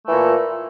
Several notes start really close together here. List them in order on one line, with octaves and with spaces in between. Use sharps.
A3 E3 A#2